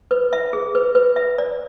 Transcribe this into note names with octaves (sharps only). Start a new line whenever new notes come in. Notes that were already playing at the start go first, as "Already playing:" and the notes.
B4
E5
G#4
B4
B4
E5
D5